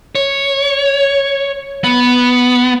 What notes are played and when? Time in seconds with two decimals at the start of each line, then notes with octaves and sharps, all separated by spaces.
0.15 C#5
1.84 B3